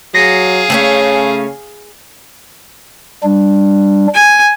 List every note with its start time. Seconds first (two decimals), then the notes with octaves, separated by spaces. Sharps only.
0.14 F#3 G#4 F5 A#6 C7 C#7
0.70 C#3 A3 C4 C#4
3.23 G3 D4
4.14 G#5